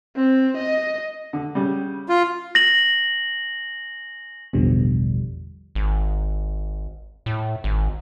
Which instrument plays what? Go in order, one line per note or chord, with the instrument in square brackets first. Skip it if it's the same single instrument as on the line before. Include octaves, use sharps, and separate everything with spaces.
[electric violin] C4
D#5
[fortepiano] D3
C#3 G3
[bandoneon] F4
[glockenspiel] A#6 F#7
[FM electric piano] A1 E2 B2 D3 F3 G3
[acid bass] G#1
A2
G#1